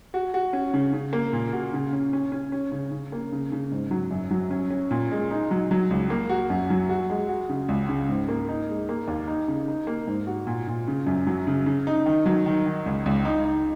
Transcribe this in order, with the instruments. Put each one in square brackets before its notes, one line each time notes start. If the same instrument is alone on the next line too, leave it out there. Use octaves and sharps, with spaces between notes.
[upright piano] F#4
F#4
C#4
C#3
C#3
A#3
A#2
F#4
C#3
C#4
C#4
C#4
C#4
C#3
C#3
A#3
C#3
C#3
G#2
F#3
F#2
F#3
C#4
C#4
A#2
G#3
D#4
F#3
F#3
C#2
A#3
F#4
F#2
F#3
F#4
G#3
F#4
C#3
C#2
C#3
G#2
A#3
D#4
G#3
A#3
D#2
D#4
C#3
D#4
A#3
G#2
F#4
A#2
A#2
C#3
F#2
F#3
C#3
C#3
D#4
D#3
F#3
D#3
D#3
C#2
C#2
D#4
D#4